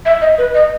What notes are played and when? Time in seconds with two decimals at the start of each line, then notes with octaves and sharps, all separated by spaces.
0.06 E5
0.21 D#5
0.38 B4
0.54 D#5